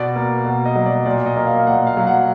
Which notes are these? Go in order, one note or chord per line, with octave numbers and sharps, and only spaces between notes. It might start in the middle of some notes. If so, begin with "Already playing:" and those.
Already playing: B2 D5
A#3
B2
D#5
F#3
D5
A#2 D5
D#5
A#3
F5
A#2 F#5
F5
F#3
F#5